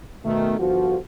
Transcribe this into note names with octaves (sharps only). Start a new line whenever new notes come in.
B2 D#3 A3
G1 F3 F#4